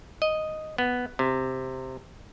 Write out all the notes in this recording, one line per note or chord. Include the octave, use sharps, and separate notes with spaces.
D#5
B3
C3